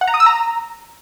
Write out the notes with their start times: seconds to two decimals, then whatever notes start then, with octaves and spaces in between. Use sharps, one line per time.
0.01 F#5
0.07 A#5
0.14 D#6
0.20 E6
0.26 A#5